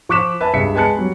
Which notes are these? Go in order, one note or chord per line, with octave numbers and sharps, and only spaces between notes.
F3 C#6 D6 F#6 B6 E7
B4 E5 G#5 A5
C#2 G2 E5 B6 C#7
G#3 B4 G#5 A5 F#6 C#7
F#3 G3